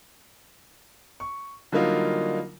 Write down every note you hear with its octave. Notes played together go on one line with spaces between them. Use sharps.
C#6
D3 F#3 G3 A#3 D#4 F4